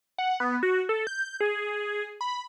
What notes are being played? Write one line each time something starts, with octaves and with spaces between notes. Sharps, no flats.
F#5
B3
F#4
A4
G6
G#4
B5